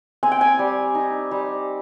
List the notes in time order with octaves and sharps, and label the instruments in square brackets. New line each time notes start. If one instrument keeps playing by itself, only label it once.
[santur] C4 G#5
G5
G#5
G3
D#4
G3